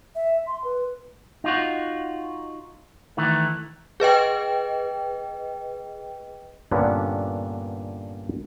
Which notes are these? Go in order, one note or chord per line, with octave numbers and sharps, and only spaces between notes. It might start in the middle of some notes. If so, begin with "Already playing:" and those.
E5
C6
B4
D#4 F4 F#4
D#3 E3 A3
G#4 B4 D#5 G5
G2 A#2 D3 B3 C#4 D4